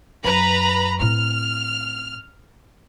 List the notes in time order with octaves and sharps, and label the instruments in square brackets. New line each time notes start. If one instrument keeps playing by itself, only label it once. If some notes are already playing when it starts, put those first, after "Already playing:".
[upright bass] F#2 [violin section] B4 A#5 B5
[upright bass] A2 C4 [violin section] F6